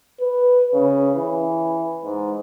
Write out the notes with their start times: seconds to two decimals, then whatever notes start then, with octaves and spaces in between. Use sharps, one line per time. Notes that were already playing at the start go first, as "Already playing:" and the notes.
0.20 B4
0.74 C#3
1.15 E3
2.03 G#2